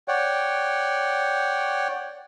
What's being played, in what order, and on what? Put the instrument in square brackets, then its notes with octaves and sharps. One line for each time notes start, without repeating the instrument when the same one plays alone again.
[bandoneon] C#5 D5 F#5 G5